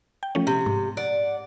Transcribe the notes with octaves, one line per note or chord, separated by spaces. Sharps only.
G5
F3 A3 C#4
C3
G#2
D5 F#5